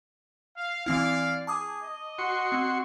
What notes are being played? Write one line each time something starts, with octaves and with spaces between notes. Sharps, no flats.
F5
E3 C4 E4 D5 F5
G#4 A5 D6 D#6
D#5
F#4 C6 C#6
C4